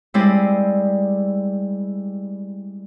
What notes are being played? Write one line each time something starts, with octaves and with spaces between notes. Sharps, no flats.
G3 G#3 C4 E4 D5 D#5